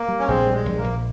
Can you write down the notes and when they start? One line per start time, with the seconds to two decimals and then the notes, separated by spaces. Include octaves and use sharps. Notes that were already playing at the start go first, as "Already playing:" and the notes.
Already playing: A#3
0.08 G3
0.19 C#4
0.27 A#1 G#3 C4
0.47 G3
0.53 G#3
0.65 A#1
0.78 A#3
0.84 A#1